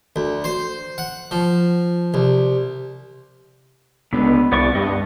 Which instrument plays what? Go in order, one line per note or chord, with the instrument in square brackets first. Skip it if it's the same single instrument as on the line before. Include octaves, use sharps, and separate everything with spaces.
[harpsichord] D2
C5
F#5
F3
C2
[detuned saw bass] C#2 [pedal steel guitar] D3 B3 B4
[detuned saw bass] C2 [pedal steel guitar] B3 D5 C#6
[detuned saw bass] G2 [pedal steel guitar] B3 D#5